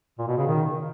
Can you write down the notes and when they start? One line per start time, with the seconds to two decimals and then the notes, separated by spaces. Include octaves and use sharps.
0.18 A#2
0.28 B2
0.37 C#3
0.47 D#3